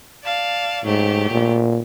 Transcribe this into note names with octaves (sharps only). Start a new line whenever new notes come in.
D5 F5 A5
G#2 F#3 A3 G4
A#2